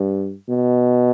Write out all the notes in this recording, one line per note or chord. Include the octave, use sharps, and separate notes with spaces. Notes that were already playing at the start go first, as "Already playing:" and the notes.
Already playing: G2
B2